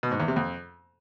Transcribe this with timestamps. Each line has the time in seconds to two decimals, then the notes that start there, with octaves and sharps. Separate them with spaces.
0.03 B2
0.11 G#2
0.20 E2
0.28 C3
0.36 F2